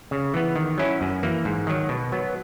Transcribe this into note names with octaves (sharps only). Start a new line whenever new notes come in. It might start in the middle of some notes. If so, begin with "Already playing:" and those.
C#3
E3 B3
D#3
F#3 C#4 E4
F#2
E3 A#3
G#2
D#3 F#3
B2
F#3 B3